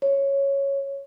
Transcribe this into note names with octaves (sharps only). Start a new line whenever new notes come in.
C#5